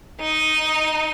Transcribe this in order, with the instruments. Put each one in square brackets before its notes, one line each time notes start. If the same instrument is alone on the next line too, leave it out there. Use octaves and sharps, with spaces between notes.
[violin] D#4 D#7